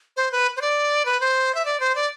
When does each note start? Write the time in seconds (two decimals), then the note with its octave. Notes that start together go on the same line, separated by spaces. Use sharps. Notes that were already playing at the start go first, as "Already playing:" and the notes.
0.17 C5
0.32 B4
0.57 C5
0.61 D5
1.05 B4
1.20 C5
1.55 E5
1.65 D5
1.80 C5
1.95 D5